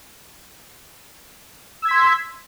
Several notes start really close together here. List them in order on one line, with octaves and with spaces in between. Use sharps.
E6 G#6 B6 C6